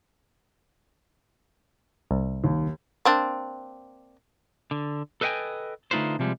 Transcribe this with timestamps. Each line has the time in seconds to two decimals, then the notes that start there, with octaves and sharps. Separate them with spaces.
2.11 C2
2.44 D#2
3.05 A#3 C4 D4
4.71 D3
5.21 A4 B4 D#5 E5 G5 G#5
5.91 D3 A3 D#4 F4 B4 C5
6.19 C3 F3 G3 G#3